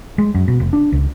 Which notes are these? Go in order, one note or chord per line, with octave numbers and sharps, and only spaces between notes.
G#3
F#2
B2
F1
D4
C#2